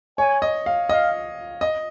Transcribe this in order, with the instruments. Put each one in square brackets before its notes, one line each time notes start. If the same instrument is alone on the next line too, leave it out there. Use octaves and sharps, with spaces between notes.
[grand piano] C#5 [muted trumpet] G#5
[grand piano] D#5
F5
[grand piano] D#5 [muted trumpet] F5
[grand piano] D#5